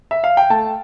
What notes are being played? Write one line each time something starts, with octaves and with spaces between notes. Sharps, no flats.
E5
F5
G5
A3 A5